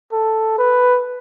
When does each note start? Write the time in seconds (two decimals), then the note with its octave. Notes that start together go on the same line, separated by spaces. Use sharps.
0.12 A4
0.58 B4